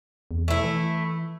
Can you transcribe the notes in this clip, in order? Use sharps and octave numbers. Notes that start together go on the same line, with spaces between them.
E2
A3 E4
E3